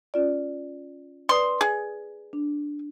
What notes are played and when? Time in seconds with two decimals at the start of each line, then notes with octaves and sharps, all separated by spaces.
0.14 C#4 F4 D5
1.29 B4 D5 C6 D#6
1.61 G#4
2.33 D4